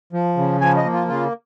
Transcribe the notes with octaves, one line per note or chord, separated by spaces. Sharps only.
F3
C#3
F3 G#5
D#5
A#3
F4
C#3 F4